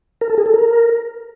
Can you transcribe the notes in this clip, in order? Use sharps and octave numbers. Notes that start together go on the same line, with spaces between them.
A#4
A4
G#4
A4
A#4